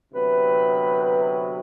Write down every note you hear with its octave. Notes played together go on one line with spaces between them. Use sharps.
D2 C3 F#3 B3 B4
B4